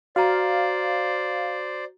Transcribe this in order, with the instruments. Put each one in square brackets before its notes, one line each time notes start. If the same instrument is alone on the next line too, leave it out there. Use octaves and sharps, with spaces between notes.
[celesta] F#4 A#5 [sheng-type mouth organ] C5 D5 [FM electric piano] F5